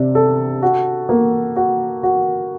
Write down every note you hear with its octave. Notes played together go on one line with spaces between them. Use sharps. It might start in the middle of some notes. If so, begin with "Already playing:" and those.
Already playing: C3 D4
A4
F#4
A#3
F#4
F#4